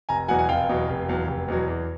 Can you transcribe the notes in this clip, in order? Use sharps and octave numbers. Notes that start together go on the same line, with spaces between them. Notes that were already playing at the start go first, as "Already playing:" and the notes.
F1 G#5 A#5
E2 B2 F#3 F#5 G#5
F#5 G#5
F1 F5 G5
E2 B2 F#3
F1
E2 B2 F#3
F1
E2 B2 F#3
E2